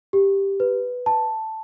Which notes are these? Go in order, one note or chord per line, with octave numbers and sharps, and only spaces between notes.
G4
B4
A5